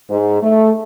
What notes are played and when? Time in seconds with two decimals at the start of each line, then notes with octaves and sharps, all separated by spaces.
0.10 G#2
0.43 A3